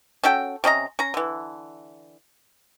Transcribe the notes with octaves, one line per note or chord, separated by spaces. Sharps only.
C#4 F#4 A4 G5
C3 C#4 D#5 A#5
C#4 A#5
D3 E3